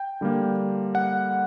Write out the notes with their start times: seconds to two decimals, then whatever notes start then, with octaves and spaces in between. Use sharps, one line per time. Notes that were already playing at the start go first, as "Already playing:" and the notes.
Already playing: G5
0.21 D3 G3 A#3
0.95 F#5